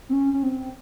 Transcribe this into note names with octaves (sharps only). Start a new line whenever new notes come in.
C4
C#4
C#4
C4